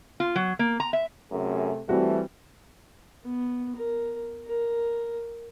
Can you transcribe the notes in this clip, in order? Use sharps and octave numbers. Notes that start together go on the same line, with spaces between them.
F4
F#3
A#3
A#5
E5
F#2 C3 A3 G#4
E3 G3 A3 C4 F#4
B3
A#4
A#4